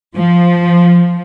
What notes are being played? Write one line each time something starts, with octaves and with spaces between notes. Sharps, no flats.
F3